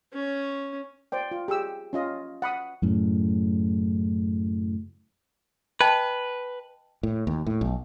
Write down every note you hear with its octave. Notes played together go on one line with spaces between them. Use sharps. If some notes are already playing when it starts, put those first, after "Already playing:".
C#4
C5 D5 G5
F4
G4 G#4 E6
C#4 F4 D#5
F#5 B5 D#6
F#2 A2 C#3
B4 D#5 G5 A5
A2
D#2
A2
B1